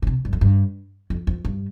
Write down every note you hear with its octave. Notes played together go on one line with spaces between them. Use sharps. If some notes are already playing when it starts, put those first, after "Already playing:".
A#2
C3
G2
F2
G2
F2
F2
G2